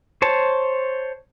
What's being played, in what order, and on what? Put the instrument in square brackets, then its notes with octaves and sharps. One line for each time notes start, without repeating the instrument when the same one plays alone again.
[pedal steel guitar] C5 C#5 A5